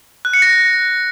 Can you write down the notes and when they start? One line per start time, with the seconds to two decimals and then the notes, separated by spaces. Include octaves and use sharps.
0.25 F#6
0.33 C#7
0.42 A#6